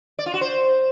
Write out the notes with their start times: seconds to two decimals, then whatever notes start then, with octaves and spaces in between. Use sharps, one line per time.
0.19 D5
0.26 F4
0.34 F#4
0.41 C5